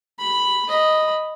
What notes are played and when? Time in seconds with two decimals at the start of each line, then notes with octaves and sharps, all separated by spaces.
0.19 B5
0.68 D#5 B5